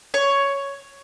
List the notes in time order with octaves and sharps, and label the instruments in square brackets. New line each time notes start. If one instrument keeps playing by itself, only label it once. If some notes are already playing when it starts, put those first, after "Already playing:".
[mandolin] C#5